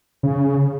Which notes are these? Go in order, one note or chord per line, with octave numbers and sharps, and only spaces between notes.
C#3